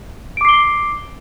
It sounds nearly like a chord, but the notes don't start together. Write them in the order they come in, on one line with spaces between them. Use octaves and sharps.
D7 D6 C7 G7